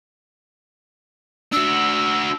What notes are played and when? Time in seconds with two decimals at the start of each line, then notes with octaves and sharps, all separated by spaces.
1.52 D4 F#4 E6